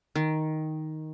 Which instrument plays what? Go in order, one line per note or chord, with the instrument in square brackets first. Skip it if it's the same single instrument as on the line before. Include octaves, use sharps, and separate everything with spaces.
[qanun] D#3